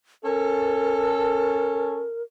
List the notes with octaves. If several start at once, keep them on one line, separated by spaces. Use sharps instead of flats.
C#4 A4 A#4